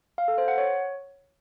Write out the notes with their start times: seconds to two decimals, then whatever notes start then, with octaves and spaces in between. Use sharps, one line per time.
0.18 F5
0.28 A4
0.38 C5
0.48 F#5
0.58 C#5